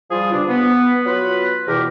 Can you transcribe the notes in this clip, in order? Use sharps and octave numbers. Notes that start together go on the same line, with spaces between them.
F3 G3 F4 G#4
G2 C#3 D4
B3
F#3 F4 B4
E2 B2 E3 G4 A#4